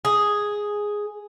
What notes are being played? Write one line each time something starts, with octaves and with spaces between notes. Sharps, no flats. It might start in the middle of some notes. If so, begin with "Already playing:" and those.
G#4